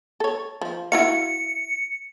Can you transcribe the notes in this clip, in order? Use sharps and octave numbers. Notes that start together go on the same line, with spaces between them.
A4 C#5
F3
E4 F#4 F5 C#7